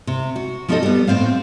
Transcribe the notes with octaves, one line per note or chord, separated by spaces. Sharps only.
C3
F#4
F3 C4 D#4 G#4 A4 D#5
G3 B3
A2 C4 C5 F5